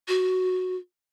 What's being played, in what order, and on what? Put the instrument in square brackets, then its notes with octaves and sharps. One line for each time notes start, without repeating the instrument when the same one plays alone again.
[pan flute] F#4